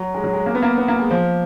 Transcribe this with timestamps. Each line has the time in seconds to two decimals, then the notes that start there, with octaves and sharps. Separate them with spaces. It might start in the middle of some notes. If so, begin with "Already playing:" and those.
Already playing: F#3
0.14 G#3
0.24 F#3
0.33 G#3
0.46 A#3
0.55 B3
0.63 A#3
0.78 B3
0.88 A#3
0.99 G#3
1.11 F3